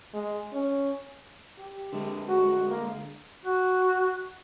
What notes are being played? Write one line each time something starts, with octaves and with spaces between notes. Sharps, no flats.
G#3
C#4
G4
D3 G#3
F#4
A#3
F#4